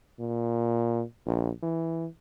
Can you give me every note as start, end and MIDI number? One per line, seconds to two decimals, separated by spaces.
0.20 1.03 46
1.26 1.50 34
1.63 2.07 52